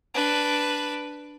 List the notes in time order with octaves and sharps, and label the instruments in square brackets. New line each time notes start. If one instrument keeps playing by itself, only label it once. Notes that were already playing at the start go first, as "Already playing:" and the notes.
[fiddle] D4 B4